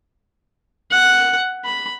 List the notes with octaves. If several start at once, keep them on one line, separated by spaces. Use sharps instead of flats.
F#5
B5